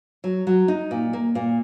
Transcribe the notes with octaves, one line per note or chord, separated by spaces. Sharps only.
F#3
F#3
D#4
A#2
A#3
A#2